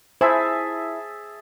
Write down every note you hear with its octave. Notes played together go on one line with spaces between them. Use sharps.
E4 G#4 C5 E5 G#5 A5